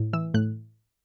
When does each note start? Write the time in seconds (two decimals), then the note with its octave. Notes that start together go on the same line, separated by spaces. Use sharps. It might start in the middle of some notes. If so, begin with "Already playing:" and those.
Already playing: A2
0.13 E3 E6
0.34 A2 F#6